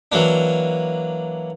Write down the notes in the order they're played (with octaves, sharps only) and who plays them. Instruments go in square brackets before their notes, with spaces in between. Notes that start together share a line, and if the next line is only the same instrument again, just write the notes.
[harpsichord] E3 F#3 A#3 D4